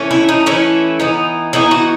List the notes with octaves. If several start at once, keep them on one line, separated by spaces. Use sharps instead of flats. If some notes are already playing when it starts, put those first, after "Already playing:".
Already playing: E3 A3 C#4
E4
D#4
E3 A3 C#4 E4
E3 B3 D#4
E3 B3 D#4 E4
F#4